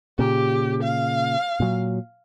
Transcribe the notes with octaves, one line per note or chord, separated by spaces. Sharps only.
A#2 C#3 G4
F5
A#2 F#3